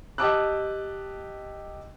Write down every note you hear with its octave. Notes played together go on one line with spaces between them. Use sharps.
G4 D#5 A5 D6 E6 F#6